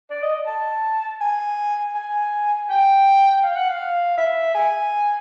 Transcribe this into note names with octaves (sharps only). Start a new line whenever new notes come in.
D5
D#5
A5
G#5
G#5
G5
F5
F#5
F5
E5
G#5